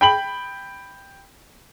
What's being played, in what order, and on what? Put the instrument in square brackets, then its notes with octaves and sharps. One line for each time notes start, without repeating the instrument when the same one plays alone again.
[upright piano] G5 B5 F#7